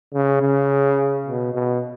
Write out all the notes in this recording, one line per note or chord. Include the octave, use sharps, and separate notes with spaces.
C#3
C#3
B2
B2